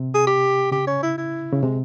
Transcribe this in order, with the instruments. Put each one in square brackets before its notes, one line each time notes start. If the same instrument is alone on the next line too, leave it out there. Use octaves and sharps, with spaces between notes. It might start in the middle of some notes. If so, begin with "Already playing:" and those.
Already playing: [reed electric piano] C3
[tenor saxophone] G#4
G4
[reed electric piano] C#3 [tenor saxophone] G4
[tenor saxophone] C#4
E4
E4
[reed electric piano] C#3
[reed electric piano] C3 [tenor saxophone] G#3